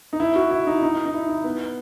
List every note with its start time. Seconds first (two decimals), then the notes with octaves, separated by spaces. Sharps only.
0.13 D#4
0.20 E4
0.36 F#4
0.51 E4
0.67 D#4
0.83 D#4
1.06 D#4
1.13 E4
1.29 D#4
1.44 B3